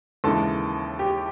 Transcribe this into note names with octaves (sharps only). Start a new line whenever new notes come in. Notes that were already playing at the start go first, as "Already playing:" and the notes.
D#2 C#3 E3 G#3 A4
G4